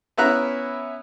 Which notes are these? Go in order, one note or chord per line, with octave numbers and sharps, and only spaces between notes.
B3 C#4 E4 E5 A#5 F#6